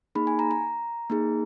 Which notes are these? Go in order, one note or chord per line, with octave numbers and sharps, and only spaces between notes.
A#3 D#4 G#4 B5
G#5
A#5
A#5
A#3 D#4 G#4